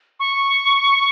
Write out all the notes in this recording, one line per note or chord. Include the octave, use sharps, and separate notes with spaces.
C#6